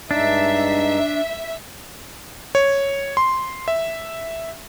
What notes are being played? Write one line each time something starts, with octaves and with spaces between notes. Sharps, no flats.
G2 G#3 D4 D#4 E5
C#5
C6
E5